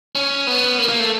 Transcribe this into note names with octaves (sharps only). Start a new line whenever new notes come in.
C#4
B3
A#3
A#3
A3